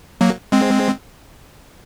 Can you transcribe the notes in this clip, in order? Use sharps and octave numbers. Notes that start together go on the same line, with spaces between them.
F#3 A#3
G#3 C4